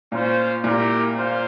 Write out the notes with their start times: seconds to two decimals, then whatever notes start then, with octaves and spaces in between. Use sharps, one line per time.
0.11 A#2 C#4 F4 C5
0.64 A#2 A#3 E4 G4 A#4
1.16 A#3 F4 C5 F5